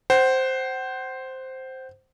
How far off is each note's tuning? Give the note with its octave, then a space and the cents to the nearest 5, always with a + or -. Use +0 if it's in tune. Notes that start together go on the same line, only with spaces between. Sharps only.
C5 +0 F#5 +35